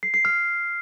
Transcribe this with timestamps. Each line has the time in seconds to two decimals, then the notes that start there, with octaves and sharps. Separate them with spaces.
0.03 C7
0.14 C7
0.25 F6